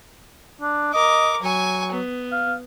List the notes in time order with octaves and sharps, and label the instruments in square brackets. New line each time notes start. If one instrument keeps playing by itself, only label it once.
[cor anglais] D4
[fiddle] A#4 D6 [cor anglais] D#5
[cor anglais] F#3 [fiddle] G#5 C#6
[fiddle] B3
[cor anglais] F5